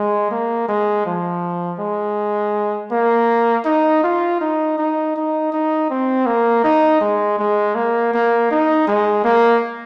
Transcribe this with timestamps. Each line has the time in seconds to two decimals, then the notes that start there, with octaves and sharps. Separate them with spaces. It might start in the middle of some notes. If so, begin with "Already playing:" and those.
Already playing: G#3
0.31 A#3
0.69 G#3
1.06 F3
1.79 G#3
2.92 A#3
3.66 D#4
4.04 F4
4.41 D#4
4.78 D#4
5.16 D#4
5.53 D#4
5.90 C4
6.26 A#3
6.64 D#4
7.01 G#3
7.39 G#3
7.75 A#3
8.14 A#3
8.51 D#4
8.87 G#3
9.25 A#3